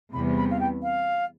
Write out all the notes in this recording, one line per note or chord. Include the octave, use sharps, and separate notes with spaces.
E2 C3 G3 B3 B5
B5
F5
G5
F5